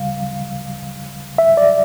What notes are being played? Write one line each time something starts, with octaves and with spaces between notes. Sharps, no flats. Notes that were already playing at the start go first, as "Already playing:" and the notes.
Already playing: D2 C#3 G3 F5
E5
D5